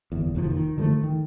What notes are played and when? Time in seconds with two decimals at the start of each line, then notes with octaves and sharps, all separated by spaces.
0.12 G1 E2
0.35 F1 D#2 C3 F3
0.50 D#3
0.78 D3 F3 G#3 A3
1.03 D#3